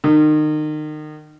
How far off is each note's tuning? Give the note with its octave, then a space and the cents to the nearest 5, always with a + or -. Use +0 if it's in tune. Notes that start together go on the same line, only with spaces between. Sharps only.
D#3 -30